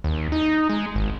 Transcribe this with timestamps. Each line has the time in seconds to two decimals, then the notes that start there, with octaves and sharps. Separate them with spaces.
0.04 D#2
0.32 D#4
0.70 G#3
0.95 G#1